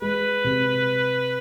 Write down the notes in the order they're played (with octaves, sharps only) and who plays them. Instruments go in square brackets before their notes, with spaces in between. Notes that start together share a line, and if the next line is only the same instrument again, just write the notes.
[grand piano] G#3 [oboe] B4
[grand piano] C3